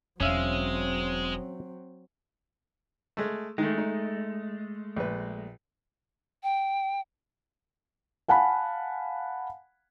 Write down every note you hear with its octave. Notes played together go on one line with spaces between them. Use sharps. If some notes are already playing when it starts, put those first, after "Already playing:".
E1 F#3 G#3 C4 C#4 E5 F5
G#3 A3
D#3 G#3 A3
D#4
A#1 B4
G5
F5 F#5 G#5 A5 B5